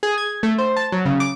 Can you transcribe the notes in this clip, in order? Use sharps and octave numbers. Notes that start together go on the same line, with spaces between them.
G#4
G#6
A3
C5
A5
F#3
C#3
D6